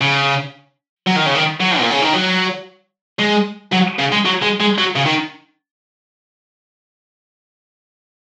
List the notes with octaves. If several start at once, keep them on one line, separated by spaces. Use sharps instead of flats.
C#3
F#3
D#3
C#3
D#3
F#3
A#2
C#3
D#3
F#3
G#3
F#3
C#3
G#3
F#3
G#3
G#3
F#3
C#3
D#3